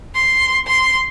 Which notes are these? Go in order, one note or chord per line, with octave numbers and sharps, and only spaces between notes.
C6
C6